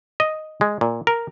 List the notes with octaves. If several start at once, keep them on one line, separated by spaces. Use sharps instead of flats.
D#5
G#3
A#2
A#4